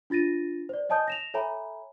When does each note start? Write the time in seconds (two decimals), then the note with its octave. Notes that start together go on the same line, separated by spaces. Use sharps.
0.10 D4 F4 A6 A#6 D#7
0.69 C5 D5
0.89 C#5 D#5 G#5 A5 D#6 G6
1.08 A#6 E7 F7
1.34 A4 C#5 E5 G#5 A#5 B5